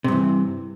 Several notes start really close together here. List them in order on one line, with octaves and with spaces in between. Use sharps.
C3 G2 E3